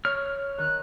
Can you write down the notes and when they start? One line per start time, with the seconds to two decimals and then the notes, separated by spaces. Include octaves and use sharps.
0.05 C#5 F6
0.58 D#3 F#6